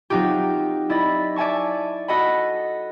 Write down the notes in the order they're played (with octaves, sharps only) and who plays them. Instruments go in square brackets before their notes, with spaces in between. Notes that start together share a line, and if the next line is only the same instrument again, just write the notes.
[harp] F#3 C4 D#4 F4 G4
E4 D5 D#5 B5 A6
D5 E5 G#5 A5 C#6
F#4 A4 D#5 F#5 B5